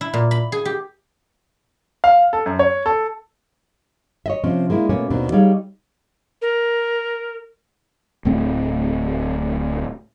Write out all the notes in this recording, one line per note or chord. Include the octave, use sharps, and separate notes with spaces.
E4
A#2
B5
G#4
G4
F5
A4
F#2
C#5
A4
C#5 D#5 E5
C3 F3 C4 C#4
G#3 A#3 D4 E4
B2 A3 A#3 C#4
D#2 B2 D#3 C4 D4
G3 D#4 G#4 C#5 F5
A#4
D1 A2 A3 C4